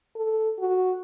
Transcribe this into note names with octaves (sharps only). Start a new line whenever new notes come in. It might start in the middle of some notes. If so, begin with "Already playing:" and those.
A4
F#4